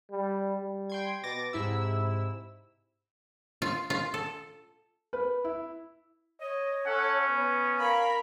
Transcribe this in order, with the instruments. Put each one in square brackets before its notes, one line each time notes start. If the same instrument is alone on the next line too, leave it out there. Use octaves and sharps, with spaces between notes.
[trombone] G3
G3
[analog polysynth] G5 C6 G#6
[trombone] B2 [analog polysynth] D6 A6 A#6
[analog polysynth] G#2 E4 E6 [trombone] C3
[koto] F4
F4
A4
[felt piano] B4
E4
[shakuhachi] C#5 [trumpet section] D#5
[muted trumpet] C#4 [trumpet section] A4 F#5
[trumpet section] B3
[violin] A#4 B5 [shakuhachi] F5